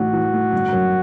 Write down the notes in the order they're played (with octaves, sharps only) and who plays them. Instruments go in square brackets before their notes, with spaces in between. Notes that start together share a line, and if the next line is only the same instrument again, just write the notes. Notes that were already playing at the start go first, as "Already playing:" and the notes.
Already playing: [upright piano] A1 A2 [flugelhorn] F#4
[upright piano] E3
A3
G1
F#2